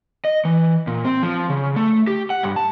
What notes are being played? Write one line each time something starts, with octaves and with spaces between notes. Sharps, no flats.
D#5
E3
A#2
C4
F3
C#3
A3
G4
F#5
G2
A5